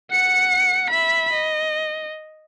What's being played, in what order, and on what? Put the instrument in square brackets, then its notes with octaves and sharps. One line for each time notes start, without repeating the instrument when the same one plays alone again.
[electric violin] F#5 C#7
E5 B5
D#5